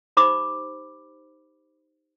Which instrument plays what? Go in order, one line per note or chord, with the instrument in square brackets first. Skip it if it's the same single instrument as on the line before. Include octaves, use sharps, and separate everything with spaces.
[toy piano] D#4 G4 C5 B5 D6